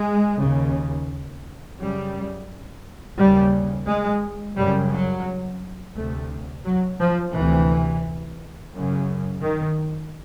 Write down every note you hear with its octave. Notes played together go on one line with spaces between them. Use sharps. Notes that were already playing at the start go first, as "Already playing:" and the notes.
Already playing: G#3
D#2 C#3
F#2 C#3 G3
D#2 C#3 G3
G#3
F#2 C#3 G3
F#3
D2 C3 A3
F#3
F3
D2 C3 E3
F#2 C#3
D#3